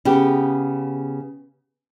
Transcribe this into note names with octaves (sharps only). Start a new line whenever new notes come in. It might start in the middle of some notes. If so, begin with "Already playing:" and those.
C#3 B3 G4